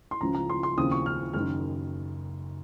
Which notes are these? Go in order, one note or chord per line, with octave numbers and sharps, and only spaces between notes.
C6
C#2 C#3 F3 A#5
A#5
C6
C6
D#2 C#3 F3 C4 D#6
C#6
F6
F#1 F#2 D#3 F6